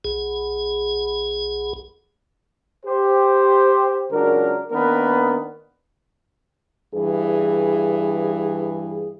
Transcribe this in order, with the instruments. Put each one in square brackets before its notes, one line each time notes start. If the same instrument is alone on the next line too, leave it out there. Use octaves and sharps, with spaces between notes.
[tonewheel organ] B1 G#4
[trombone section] G4 C5
C#2 C#3 F#3 D4 A#4
D#3 A#3 B3 D4 A#4 B4
[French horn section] G2 E3 G#4